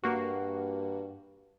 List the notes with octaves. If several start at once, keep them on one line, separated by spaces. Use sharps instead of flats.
G2 A#3 F#4